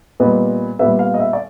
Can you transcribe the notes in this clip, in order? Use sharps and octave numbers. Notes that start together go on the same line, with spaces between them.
A#2 G3 B3 D#5
A#2 G3 B3 E5
F5
D#5
E5
D5